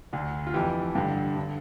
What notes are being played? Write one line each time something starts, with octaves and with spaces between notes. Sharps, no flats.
D2 D3
F4
F2 E3 G4
G2 D3 G4
D3